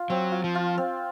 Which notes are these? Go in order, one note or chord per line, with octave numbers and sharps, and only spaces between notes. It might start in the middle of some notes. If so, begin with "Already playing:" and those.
Already playing: F4
F#3 C4
F4
F3
F4
C4